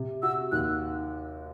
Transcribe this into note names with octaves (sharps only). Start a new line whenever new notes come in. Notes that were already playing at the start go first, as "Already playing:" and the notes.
Already playing: C3
F#4 E6
D#2 F#6